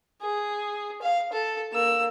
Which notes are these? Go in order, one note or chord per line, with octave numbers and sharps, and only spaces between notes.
G#4
F5
A4
A#3 E6